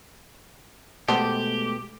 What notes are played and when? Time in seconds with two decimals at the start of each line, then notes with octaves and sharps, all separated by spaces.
1.08 B2 G#3 A3 B3 G4 A4 C5